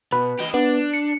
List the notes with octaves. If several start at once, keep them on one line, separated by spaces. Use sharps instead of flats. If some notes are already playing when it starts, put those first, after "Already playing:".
B2 B4
G4 D#5
B3 D4
C#7